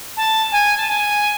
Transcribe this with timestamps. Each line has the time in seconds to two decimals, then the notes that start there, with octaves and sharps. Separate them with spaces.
0.17 A5
0.52 G#5
0.77 A5
0.89 G#5